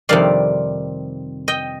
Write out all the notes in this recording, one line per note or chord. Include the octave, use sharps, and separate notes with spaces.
F2 C3 D#3 G3 D5 F5
D#5 G5